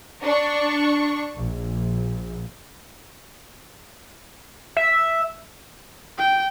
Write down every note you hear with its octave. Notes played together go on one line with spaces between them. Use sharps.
D4 C#6
A#1
E5
G5